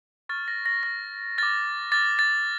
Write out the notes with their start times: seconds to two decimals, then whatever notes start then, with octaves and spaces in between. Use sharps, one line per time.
0.29 C#6 F6 A6
0.48 A#6
0.66 A#6
0.83 C#6 F6 A#6
1.38 D6 F6 A6
1.92 D6 F6 A6
2.19 A6